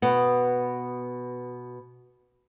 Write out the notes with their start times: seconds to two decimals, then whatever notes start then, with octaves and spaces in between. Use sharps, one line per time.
0.02 B2 B3